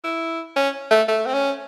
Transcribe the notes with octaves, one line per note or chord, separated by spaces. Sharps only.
E4
C#4
A3
A3
C4
C#4